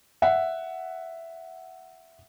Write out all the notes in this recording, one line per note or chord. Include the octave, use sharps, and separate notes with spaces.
E5 F#5